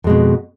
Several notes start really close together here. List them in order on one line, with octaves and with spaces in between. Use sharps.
F2 G#3 B2